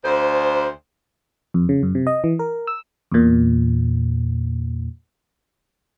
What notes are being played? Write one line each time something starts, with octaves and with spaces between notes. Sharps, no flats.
D2 C5
F2
C#3
F#2
C3
D#5
E3
A#4
E6
E2 A#2